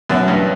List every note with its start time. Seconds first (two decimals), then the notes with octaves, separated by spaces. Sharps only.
0.09 F#2 B2 F#3 B3 E4
0.28 G2